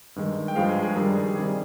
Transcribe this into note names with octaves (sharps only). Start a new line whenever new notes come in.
G2 D#3 G#3
G5
G2 F3 G#3 F5
G#4
G#4
G2 D#3 G3 A#4
G#4
G4
C3 D#3 G3 G#4